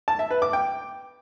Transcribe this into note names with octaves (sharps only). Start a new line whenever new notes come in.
A5
E5
B4
D6
G5